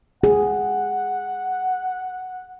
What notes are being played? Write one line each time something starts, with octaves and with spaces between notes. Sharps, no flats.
G#4 F#5